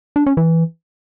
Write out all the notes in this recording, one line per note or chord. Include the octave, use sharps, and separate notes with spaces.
D4
C#4
E3